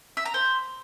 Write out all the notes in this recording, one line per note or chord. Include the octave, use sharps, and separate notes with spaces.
E5
A#5
C5